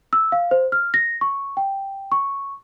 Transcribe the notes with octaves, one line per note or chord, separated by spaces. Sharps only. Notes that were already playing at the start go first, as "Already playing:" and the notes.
E6
F5
C5
F6
A#6
C#6
G5
C#6